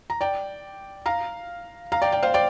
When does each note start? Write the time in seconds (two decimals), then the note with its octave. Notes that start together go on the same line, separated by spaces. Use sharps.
0.10 A#5
0.21 D5 G5
1.06 F5 A#5
1.92 F5 A#5
2.02 D5 G5
2.12 D5 G5
2.23 C5 F5
2.34 D5 G5